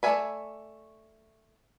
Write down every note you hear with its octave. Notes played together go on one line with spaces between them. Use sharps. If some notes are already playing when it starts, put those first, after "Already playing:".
A3 D5 E5 G#5 B5